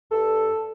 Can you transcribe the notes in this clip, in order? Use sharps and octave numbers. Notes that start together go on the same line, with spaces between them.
G2 A4